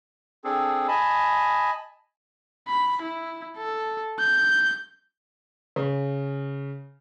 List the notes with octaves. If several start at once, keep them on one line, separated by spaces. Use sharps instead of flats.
C4 D4 G#4 A4
D#5 G#5 A5 B5
B5
E4
A4
G6
C#3